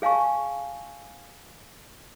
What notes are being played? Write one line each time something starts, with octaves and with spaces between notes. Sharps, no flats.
G#4 F5 G#5 A5 C#6